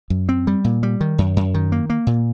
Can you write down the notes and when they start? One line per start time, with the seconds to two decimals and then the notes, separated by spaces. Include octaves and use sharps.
0.10 F#2
0.29 C4
0.47 G3
0.64 A#2
0.83 G3
1.01 D#3
1.18 F#2
1.37 F#2
1.54 D#3
1.72 A#3
1.90 A#3
2.07 A#2